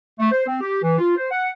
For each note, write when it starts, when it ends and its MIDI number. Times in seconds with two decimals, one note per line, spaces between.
0.19 0.30 57
0.31 0.43 72
0.46 0.60 60
0.61 0.79 67
0.82 0.97 52
0.98 1.14 65
1.16 1.26 72
1.31 1.49 78